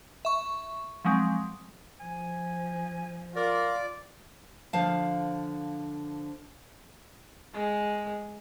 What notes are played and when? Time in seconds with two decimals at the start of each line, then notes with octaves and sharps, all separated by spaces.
0.25 E5 C#6
1.05 F3 F#3 G#3 C4
2.00 F3 G#5
3.36 F4 A#4 D5
4.73 D3 F3 F5 A5
7.54 G#3